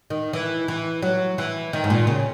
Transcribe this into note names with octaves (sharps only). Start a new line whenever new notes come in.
D#3
E3
E3
F#3
E3
D#3
G#2
A#2
C#3